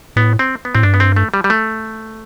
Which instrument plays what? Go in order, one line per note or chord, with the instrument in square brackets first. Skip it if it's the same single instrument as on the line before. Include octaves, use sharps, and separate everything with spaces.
[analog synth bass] A2 [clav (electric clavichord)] B3
[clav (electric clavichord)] C4
B3
[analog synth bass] A2 [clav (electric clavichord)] C4
[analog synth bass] G2 [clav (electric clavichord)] D4
[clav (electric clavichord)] B3
C4
A3
G3
G3
A3